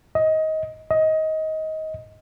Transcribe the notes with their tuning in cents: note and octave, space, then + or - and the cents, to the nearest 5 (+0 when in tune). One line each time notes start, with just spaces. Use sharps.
D#5 +20
D#5 +20